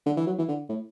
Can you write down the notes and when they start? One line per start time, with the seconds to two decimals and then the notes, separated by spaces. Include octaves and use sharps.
0.06 D3
0.17 E3
0.27 F#3
0.38 E3
0.48 D3
0.69 A2